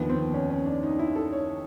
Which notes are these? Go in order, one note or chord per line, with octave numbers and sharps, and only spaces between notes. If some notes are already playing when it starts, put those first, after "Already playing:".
Already playing: D#2 D3 F3 B3
C4
C#4
C#4
D4
D#4
E4
A4
C#5